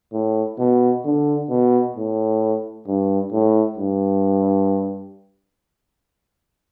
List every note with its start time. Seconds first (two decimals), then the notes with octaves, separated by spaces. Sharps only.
0.13 A2
0.59 B2
1.05 D3
1.50 B2
1.96 A2
2.87 G2
3.32 A2
3.77 G2